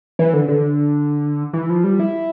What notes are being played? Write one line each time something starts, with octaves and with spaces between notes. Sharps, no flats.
E3
D3
D3
E3
F3
G3
E4